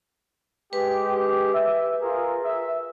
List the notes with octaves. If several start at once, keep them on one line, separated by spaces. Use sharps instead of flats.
G#3 G4 B4
E5
F4 G#4 A#4
E5